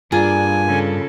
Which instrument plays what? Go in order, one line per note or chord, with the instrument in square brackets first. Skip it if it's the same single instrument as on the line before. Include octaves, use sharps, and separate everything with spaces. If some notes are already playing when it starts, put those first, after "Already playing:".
[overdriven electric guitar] G2 [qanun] A#3 F4 G#4 [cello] D4 [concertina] G#5
[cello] C#3 A4